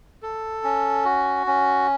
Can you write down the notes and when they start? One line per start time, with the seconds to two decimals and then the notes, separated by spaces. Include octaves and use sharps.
0.23 A4
0.64 C#4
1.05 F#4
1.47 C#4